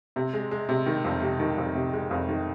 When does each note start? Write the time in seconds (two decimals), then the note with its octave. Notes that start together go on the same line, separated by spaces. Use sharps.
0.16 C3
0.34 G#3
0.51 G#3
0.69 C3
0.86 D#3
1.04 F2
1.22 C3
1.40 D#3
1.58 F2
1.75 C3
1.93 G#3
2.11 F2
2.29 D#3